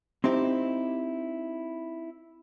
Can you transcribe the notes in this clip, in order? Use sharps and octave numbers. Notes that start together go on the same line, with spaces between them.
C4 D#4 E4 G4